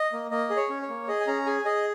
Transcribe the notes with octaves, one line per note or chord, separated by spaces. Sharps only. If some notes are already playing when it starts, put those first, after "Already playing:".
Already playing: D#5
A#3
A#3 D#5
G#4
C#5
C#4
C#5
A#3
G#4 D#5
G#5
C#4 A#5
G#4 G#5
G#4 D#5